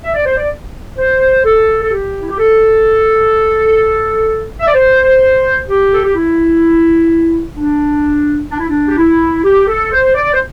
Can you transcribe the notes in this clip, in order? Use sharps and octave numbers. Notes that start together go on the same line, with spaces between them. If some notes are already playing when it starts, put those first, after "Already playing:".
E5
D5
C5
D5
C5
A4
A4
G4
E4
G4
A4
E5
D5
C5
G4
A4
G4
E4
D4
D4
E4
D4
G4
E4
G4
A4
C5
D5
C5